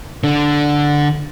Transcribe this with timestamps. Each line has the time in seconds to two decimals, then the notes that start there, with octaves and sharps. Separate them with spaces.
0.24 D3